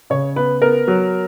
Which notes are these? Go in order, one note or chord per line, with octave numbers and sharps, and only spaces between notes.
C#3 C#5
B3 B4
B3 A#4
F#3